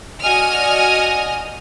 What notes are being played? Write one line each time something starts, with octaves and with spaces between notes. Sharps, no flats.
F#4 D5 D#5 G#5 D#6 F6